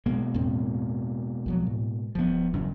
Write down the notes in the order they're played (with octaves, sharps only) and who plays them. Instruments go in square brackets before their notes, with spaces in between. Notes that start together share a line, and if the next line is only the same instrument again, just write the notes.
[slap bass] B2 G#3 A#3
[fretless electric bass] E2 A2 C4
D2 F3 F#3
A2
[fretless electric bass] D#1 [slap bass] F3 B3
[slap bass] F#2 C#3